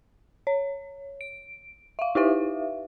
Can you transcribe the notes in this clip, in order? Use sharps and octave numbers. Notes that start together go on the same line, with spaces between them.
C#5
D7
E5 F5
D#4 E4 G4 B4 E5 F5